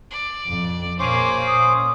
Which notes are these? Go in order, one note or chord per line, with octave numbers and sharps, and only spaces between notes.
D5
F2
A#2 A#3 C#4 G#4 C5 D6
D#6